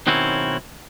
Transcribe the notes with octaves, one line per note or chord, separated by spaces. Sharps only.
B1 D#3 F#3 C4 C#4 E4